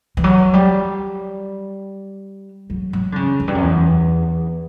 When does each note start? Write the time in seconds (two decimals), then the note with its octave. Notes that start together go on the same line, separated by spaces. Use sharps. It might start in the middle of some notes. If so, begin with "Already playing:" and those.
0.17 E3
0.24 F#3
0.54 G3
2.70 F#3
2.93 F#3
3.12 D3
3.16 C#3
3.40 F#2
3.48 G2
3.55 F#2
3.62 E2